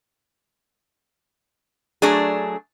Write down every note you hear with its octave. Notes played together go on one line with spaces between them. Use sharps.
F#3 A3 D4 G#4